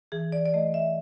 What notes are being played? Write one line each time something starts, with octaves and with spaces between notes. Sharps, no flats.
E3 G#4
D5
D5
A3 D#5
E5